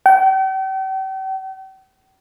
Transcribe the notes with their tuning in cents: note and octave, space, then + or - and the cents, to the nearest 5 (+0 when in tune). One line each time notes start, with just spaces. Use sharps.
G5 -40